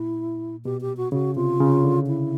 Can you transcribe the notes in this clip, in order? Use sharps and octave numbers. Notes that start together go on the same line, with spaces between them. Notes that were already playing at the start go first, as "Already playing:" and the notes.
Already playing: A#2 E4
B2 G4
G4
F#4
C#3 F#4
C3 F4
C#3
D3
E4